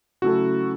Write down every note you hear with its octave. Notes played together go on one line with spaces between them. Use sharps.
C#3 F#3 A3 E4 F#4 A4